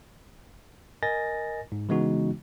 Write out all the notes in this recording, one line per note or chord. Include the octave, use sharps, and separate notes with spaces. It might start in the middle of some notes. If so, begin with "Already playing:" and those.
A#4 D#5 G#5 A6 A#6
G#2
C#3 E3 G#3 B3 D#4 F#4